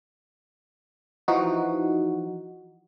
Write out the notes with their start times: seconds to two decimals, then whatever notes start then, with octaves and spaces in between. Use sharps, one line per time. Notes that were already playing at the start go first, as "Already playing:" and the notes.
1.28 E3 F3 D#4 F#4